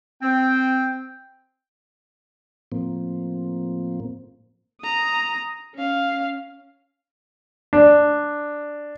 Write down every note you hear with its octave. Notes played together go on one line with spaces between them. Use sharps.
C4 G5
A2 F3 A#3 C4
A#5 D#6
C#4 F5
D4